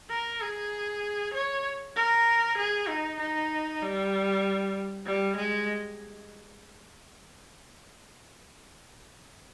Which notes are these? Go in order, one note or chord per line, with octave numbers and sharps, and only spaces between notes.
A#4
G#4
C#5
A#4
G#4
D#4
D#4
G3
G3
G#3